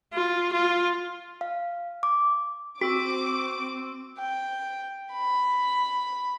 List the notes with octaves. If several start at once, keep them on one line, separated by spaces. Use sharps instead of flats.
F4
F4
F5
D6
C4 F#4 C#6 D6 E6 D7
G5
B5